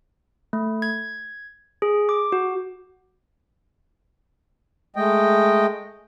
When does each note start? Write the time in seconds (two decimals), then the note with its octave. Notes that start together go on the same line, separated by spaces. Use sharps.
0.53 A3
0.82 G#6
1.82 G#4
2.09 D6
2.32 F#4
4.96 G#3 A3 D#5 G5